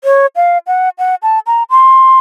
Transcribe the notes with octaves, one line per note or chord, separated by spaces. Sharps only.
C#5
F5
F#5
F#5
A5
A#5
C6